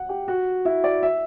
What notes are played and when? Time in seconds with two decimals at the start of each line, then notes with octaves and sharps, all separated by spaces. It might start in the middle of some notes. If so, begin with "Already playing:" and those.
Already playing: F#5
0.09 G4
0.28 F#4
0.65 E4
0.84 D5
1.03 E5